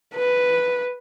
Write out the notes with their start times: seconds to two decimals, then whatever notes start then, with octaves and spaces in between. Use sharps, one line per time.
0.15 B4